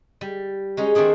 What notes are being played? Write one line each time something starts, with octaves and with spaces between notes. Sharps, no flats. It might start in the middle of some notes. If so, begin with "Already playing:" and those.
G3
G#3 C#4 D#4
D#3 A3 C4 D4 G#4